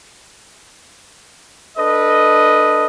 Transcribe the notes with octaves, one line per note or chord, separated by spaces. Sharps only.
D4 A4 B4 D#5